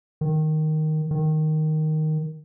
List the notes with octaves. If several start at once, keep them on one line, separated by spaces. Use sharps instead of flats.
D#3
D#3